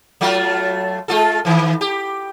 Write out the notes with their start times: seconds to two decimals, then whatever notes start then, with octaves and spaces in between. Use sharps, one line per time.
0.21 F#3 A3 F4
1.08 G#3 F4 A4
1.45 D#3 E3
1.81 G4